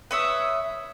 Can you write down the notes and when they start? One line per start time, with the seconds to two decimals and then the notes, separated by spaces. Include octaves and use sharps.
0.11 B4 C#5 E5 D#6